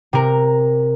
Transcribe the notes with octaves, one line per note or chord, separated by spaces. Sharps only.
C3 A#4